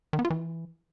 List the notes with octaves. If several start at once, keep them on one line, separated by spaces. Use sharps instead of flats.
D#3
B3
F4
E3